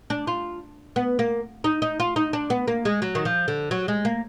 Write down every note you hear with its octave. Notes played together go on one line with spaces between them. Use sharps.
D4
F4
B3
A#3
D#4
D#4
F4
D#4
D4
B3
A#3
G#3
F#3
D#3
F3
D3
F#3
G#3
A#3